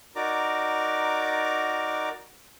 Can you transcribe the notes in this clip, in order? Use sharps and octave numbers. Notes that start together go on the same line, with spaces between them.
D#4 F#4 A#4 D5 A#5 D6